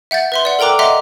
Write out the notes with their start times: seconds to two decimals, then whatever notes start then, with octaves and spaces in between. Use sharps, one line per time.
0.11 E5 F#5 G6 A6
0.32 B4 E5 C6
0.45 D5 F#5
0.59 A4 A#4 G5 A#5 D6 F#6
0.79 D#5 E5 F#5 A#5 C6 D6